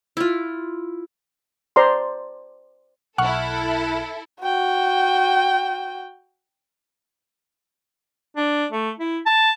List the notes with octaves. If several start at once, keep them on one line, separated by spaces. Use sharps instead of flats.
E4 F4
C5 D5 A#5 C6
B1 E4 A4 F#5 C#6 F6 F#6
F#4 G5
D4
A3
E4
A5